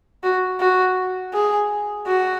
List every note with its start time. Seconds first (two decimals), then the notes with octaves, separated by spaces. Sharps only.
0.23 F#4
0.60 F#4
1.33 G#4
2.06 F#4